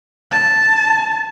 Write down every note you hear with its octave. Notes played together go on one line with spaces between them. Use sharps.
A5